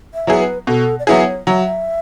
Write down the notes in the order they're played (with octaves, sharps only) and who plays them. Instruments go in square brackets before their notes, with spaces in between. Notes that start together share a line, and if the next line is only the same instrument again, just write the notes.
[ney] E5
[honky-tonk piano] F#3 B3 E4 G#4
[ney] B4
[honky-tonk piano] B2 [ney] A4
[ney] D5
[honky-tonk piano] F#3 B3 E4 G#4 [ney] C#5
[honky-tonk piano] F#3 [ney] E5